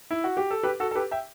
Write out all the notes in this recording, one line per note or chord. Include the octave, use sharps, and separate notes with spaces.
E4
F#4
G4
A4
G4 B4
F#4 A4
A4
G4 B4
E5 G5